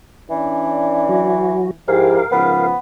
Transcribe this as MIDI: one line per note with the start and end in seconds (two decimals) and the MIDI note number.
0.30 1.75 52
0.30 1.39 61
0.30 1.39 62
0.30 1.39 74
1.09 1.71 54
1.09 1.71 66
1.88 2.19 44
1.88 2.22 53
1.88 2.22 64
1.88 2.22 67
1.88 2.67 70
1.88 2.67 77
2.32 2.71 44
2.32 2.71 49
2.32 2.71 53
2.32 2.78 59